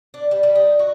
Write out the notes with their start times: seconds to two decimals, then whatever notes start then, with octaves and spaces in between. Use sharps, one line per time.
0.14 D4
0.31 G3
0.43 G3
0.55 D#4
0.79 F#4